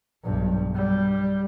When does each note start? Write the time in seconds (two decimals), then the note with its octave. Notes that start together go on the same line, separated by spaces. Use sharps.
0.24 B1 G2
0.75 G3